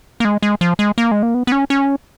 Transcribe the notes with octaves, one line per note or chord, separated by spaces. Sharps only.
A#3
G#3
G#3
F3
G#3
A#3
G#3
A#3
B3
B3
C#4
C#4